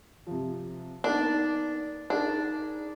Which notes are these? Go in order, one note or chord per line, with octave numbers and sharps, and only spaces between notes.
C3 F3
A#3 B3 D4 D#4
D4 D#4 G#4 A#4